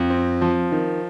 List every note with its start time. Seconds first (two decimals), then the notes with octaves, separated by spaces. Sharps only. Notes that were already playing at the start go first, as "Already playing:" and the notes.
Already playing: F2
0.10 C4
0.41 F3
0.72 D#3